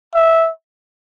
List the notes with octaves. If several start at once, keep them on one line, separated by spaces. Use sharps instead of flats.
E5